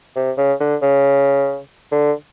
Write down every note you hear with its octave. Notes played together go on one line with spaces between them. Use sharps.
C3
C#3
D3
C#3
D3